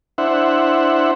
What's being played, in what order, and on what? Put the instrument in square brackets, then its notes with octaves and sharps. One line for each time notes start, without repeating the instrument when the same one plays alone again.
[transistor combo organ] D4 E4 C5 E5 F#5